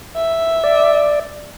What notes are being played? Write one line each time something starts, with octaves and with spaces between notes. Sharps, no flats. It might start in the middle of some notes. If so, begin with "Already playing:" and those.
E5
D5